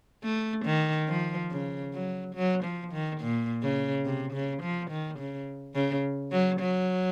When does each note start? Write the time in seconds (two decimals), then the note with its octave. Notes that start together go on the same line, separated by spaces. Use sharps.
0.24 A3
0.65 D#3
1.08 F3
1.51 C#3
1.94 F#3
2.35 F#3
2.64 F3
2.92 D#3
3.21 A#2
3.62 C#3
4.05 C3
4.33 C#3
4.62 F3
4.91 D#3
5.19 C#3
5.75 C#3
6.32 F#3
6.60 F#3